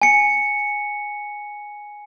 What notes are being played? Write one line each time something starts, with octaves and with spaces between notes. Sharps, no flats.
G#5 C#7